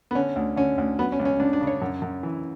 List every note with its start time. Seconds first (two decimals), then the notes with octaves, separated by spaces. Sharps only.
0.11 B3
0.15 D3 C#4
0.36 D2
0.56 D3 C#4
0.78 D2
0.99 F#3 B3
1.12 C#4
1.19 C#2
1.25 C#4
1.40 C#2 D4
1.53 D4
1.61 C#3
1.67 C#5
1.82 F#2
2.02 F#2
2.23 E3